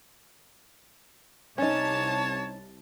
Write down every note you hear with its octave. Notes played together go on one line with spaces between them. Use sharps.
C2 C#4 D#4 C#5 A5